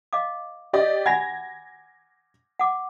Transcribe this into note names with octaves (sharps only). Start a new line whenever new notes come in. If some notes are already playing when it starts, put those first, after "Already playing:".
D#5 F5 D6
G4 D5 D#5
F#5 G#5 B5 G#6 A#6
F#5 D6